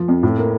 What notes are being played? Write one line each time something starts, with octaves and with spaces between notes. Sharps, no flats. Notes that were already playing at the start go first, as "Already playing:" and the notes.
Already playing: F3
F2
A2
A#3